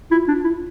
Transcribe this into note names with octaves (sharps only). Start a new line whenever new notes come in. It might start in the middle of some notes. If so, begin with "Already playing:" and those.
E4 F4
D4
F4
E4